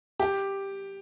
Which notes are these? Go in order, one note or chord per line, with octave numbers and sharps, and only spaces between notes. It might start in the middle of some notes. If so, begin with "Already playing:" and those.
G4